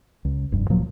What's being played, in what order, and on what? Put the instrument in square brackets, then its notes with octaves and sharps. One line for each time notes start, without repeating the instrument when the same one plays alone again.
[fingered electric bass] C#2
F1 G2
D1 A#2 F3 F#3